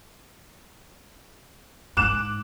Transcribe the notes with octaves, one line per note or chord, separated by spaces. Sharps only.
G#2 D6 F#6 E7